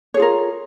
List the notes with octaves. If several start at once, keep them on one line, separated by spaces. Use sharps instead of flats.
F4 G#4 A#4 C#5